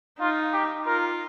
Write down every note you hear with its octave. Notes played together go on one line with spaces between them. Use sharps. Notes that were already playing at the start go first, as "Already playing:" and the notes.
D#4 F4
G4
F4 A#4